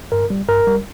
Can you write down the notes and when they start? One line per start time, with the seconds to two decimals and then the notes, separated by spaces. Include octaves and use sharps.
0.12 G2 A#4
0.30 G3
0.48 G2 A#4
0.67 G3